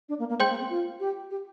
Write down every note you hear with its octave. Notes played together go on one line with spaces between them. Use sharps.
D4
A#3
A#3
G#3 C5 G5 C6 G6
A#3
C4
F4
G4
G4